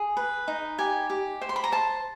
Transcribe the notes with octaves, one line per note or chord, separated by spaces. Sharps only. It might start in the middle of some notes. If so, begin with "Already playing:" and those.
Already playing: G#4
B4
D#4
G4 G#5
G4
C5
C6
B5
A#5
C5 A5